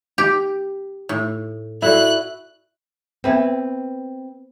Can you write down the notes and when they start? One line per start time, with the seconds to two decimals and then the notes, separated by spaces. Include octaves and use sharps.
0.18 G4
1.09 A2
1.82 E4 F#4 A4 D5 F#6
3.24 B3 C4 B4 E5 G5